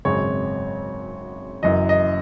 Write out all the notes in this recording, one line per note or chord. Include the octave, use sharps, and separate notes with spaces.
G#1 F#2 C#3 G#3 C4 C#5
F#1 F#2 E3 D#5
D#5